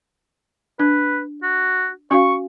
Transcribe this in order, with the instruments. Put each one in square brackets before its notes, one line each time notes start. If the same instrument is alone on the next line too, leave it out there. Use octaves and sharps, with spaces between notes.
[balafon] D4 [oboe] B4
[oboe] F#4
[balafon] C#4 F#4 F5 [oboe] C#6